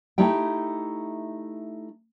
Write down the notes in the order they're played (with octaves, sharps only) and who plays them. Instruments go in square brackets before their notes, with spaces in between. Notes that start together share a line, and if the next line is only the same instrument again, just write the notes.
[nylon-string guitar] A3 D#4 E4 G4 G5